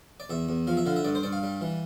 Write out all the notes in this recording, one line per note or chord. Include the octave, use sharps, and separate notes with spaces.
D5
E2 E5
E2
F3 F5
E5
D3 F5
E5
G2 D5
C5
G2 D5
F5
G3
E3